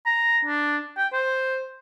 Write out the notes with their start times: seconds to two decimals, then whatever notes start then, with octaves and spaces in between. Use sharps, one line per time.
0.06 A#5
0.45 D4
0.97 G5
1.13 C5